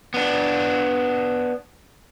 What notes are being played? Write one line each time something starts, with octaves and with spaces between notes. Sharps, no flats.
B3 D4